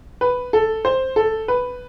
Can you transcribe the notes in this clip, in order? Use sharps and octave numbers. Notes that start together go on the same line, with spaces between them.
B4
A4
C5
A4
B4